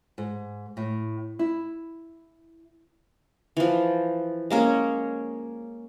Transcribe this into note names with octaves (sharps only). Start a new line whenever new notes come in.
G#2
A2
E4
E3 F3
G#3 A#3 C#4 G#4